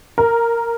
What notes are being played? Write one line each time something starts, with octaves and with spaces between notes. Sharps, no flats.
A#4